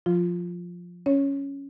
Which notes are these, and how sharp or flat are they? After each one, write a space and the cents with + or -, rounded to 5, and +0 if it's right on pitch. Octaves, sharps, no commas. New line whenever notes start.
F3 +15 F4 +0
C#4 +0 C#5 +0